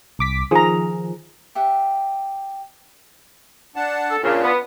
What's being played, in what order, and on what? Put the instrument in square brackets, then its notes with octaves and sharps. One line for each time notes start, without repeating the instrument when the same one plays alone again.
[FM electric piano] C2 D6 B6
[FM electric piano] D#3 F3 [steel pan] G#4 A#5
[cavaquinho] G4 E5 F#5
[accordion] D4 F#5 A5
[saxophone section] A4
[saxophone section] A#2 C#3 [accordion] D4 F4
[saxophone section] B3